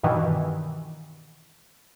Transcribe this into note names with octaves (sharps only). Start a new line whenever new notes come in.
G2 B2 D#3 E3